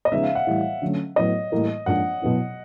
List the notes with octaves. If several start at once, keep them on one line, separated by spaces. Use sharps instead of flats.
D#5
C#3 F3 G#3 B3 D#4 E5
F5
F#5
A2 E3 G3
D3 F#3 A3 C#4
A2 F#3 B3 D#5
A2 E3 G3 A#3
G#2 F3 A#3 D4 F4 F#5
B2 F#3 B3 E4